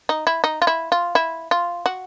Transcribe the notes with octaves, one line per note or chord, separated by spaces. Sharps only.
D#4
E4
D#4
F4
E4
F4
E4
F4
F#4